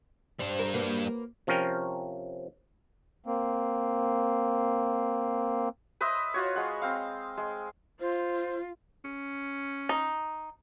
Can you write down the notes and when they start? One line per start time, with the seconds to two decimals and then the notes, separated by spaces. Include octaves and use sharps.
0.39 G3 C4 D4
0.59 A#4
0.74 A#3 F#4 B4
1.47 C3 F3 C#4 A#4 G5
3.26 A#3 C4
6.01 B4 C5 D#5 E5
6.34 F4 F#4 C#5
6.56 G#3 F#5
6.82 C4 F5
7.37 G#3
8.00 F4 C5
9.04 C#4
9.89 D#4